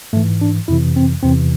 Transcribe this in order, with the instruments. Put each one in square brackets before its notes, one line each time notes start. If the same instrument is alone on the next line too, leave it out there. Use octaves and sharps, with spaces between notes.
[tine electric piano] G#2 A3
E3
D4
F2 C3 E3 E4
C4
E2 C3 E3 C4